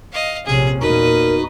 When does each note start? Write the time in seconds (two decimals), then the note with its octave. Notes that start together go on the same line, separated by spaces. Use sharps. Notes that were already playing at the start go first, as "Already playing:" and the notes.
0.13 D#5 F5
0.46 A#1 C3 C#4 G#4
0.81 E2 A#2 D#4 F#4 A#4 B4 D#5